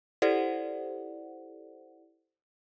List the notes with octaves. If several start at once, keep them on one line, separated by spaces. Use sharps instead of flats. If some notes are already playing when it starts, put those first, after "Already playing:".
E4 G4 A4 C5 D5 F#5